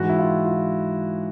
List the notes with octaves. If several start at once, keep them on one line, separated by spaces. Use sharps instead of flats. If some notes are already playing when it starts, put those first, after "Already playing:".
Already playing: G#2 E3 F#4
E4
F4
F4